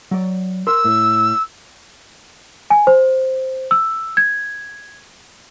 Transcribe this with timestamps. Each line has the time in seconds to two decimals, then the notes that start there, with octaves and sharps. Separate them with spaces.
0.11 F#3 D5
0.67 A#4 C6 E6
0.85 A2
2.70 G#5
2.87 C5
3.71 E6
4.17 G#6